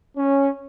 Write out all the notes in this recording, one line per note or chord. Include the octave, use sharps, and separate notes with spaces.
C#4